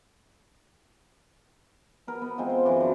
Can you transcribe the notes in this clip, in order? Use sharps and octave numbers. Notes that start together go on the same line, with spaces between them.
B3 A#4
B3
G#3 C4 F4
C5
F#2 E3 D6
F#3 D4